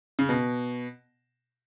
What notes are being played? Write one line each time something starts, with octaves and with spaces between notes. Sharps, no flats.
C#3
B2